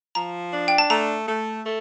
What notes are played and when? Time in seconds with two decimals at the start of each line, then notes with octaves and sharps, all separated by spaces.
0.15 F3 A#5
0.53 D4
0.68 G5
0.78 A5
0.90 A3 A#5
1.28 A3
1.65 A3